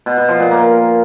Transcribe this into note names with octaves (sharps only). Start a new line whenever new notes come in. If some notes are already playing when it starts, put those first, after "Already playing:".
B2
B2
F3
A#2
A#3